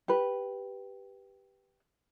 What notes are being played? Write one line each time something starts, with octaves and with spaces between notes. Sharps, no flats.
G4 B4